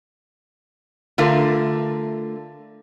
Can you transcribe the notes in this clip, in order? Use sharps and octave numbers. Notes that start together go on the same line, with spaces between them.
D3 A3 F4 A#4